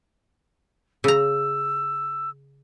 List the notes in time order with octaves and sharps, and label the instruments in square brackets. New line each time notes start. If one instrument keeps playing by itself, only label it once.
[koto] C#3 A#5 [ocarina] E6